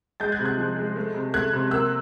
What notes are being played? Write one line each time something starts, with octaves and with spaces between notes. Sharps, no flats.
G#3 G6 A6
F#6 G#6
C3
F#6 G#6
F3
G#3
A3
C3
A3 F#6 G#6
C3
A#3 E6 F#6